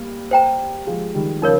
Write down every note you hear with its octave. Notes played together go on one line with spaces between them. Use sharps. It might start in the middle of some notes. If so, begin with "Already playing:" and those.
Already playing: G3 A#3
C5 G5 A#5
F3 G#3
D#3 G3
C#3 F3 D#4 A#4 C#5